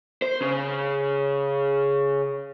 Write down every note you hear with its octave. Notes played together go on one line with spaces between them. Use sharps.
C5
C#3